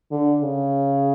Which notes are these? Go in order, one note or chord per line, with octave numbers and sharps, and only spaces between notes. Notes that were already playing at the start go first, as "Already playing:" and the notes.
D3
C#3